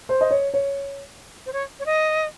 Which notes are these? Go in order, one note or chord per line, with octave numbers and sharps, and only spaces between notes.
C5
D#5
C#5
C#5
C5
C#5
C#5
D#5